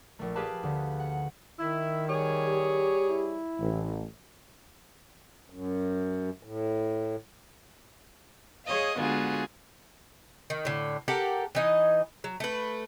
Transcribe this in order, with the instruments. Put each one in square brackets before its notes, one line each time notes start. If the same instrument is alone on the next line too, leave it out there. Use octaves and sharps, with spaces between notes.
[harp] A#1 A3
G4 G#4 B4 F5 A5
D2 D3
F#5
[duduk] D#3 [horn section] E4
[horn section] G3 G#4 C#5
[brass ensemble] G4
[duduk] E4
[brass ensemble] A1
[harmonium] F#2
A2
[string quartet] G#4 C#5 D#5 F5
D3 G#3 B3 F4 F#4 G#4
[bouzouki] D#3
A2 D3
G4 A4 A#4 F#5
E3 D#4 D#5
F#3
A3 B4